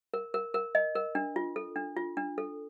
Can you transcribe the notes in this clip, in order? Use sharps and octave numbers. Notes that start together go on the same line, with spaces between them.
A#4
A#4
A#4
D#5
A#4
D4
F4
A4
D4
F4
D4
A4